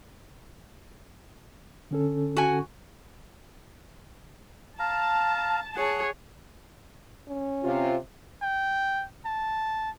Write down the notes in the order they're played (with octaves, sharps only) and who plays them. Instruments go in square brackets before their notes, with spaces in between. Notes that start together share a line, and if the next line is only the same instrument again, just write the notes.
[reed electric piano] D3 C#4 A4
[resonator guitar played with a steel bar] F#4 G#5
[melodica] F5 A#5 [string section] A5
[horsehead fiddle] G#4 C#5 [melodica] F#5
[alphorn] C#4
[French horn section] C3 F4
[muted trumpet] G5
A5